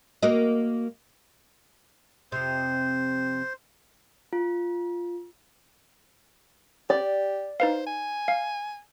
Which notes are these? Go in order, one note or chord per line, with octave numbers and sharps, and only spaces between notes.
A#3 F#4 D#5
F2 C3 C5
F4
G4 D5
D#4 B4 C5 F5
G#5
F5